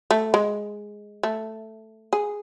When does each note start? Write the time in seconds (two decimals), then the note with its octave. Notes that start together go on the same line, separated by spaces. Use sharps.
0.11 A3
0.34 G#3
1.23 A3
2.13 G#4